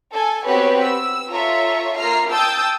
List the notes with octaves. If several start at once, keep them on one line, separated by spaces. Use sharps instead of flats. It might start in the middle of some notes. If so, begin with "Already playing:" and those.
A4 G#5
B3 C4 F#4 G4 B4 C#5
E6
F4 A4 C#5 E5 A#5 C#6
A#3 F4 E5 A#5 F6 C7
G5 A5 D#6 E6 G6 A6